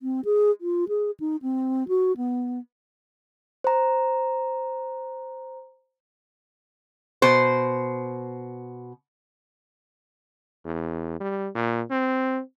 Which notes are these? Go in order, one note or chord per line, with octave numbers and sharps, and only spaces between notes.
C4
G#4
F4
G#4
D#4
C4
F#4
B3
C5 A#5
B2 C5
E2
G3
A#2
C4